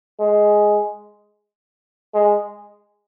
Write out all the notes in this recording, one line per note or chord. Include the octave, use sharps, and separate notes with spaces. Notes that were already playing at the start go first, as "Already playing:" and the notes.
G#3
G#3